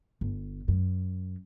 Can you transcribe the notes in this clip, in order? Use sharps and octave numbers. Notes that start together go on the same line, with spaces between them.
G1
F#2